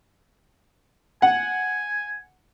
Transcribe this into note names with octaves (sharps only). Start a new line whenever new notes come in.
F#5 G#5